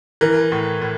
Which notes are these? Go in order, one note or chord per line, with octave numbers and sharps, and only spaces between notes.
E3 A#4
A2
A2